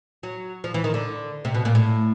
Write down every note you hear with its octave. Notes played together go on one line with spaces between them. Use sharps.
F#3
F3
E3
D#3
D3
C3
B2
A#2
A2